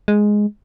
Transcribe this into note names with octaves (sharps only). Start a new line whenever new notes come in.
G#3